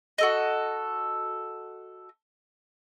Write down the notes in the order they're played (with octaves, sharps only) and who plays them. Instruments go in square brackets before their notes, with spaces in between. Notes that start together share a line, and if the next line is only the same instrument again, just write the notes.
[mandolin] F#4 A4 D#5